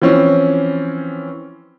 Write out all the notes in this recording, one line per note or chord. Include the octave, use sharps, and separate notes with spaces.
E3 F3 C4 C#4